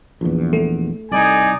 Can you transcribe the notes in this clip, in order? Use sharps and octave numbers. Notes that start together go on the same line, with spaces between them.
A#1 E2
A3
C2 D#4 D5 G#5